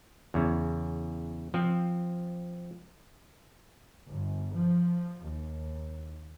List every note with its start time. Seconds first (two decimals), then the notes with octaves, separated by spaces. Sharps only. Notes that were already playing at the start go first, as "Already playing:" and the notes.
0.34 E2 C#3
1.54 F3 C4
4.08 G1
4.53 F3
5.23 D#2